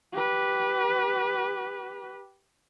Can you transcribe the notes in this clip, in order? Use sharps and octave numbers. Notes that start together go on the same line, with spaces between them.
G4 B4